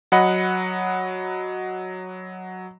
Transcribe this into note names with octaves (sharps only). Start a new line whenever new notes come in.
F#3 D#5 F#5 B5